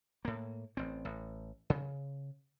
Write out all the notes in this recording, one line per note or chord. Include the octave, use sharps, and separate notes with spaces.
A2 A#3
A1 C4
A1
C#3